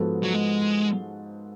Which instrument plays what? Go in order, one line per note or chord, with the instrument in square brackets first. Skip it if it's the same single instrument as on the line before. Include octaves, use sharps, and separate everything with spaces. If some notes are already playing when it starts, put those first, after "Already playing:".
Already playing: [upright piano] G#2 F3 B3 F#4 A4
[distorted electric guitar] F#3
G#3